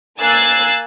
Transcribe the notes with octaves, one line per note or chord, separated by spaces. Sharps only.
A#3 G#5 E6 F#6 A6 C7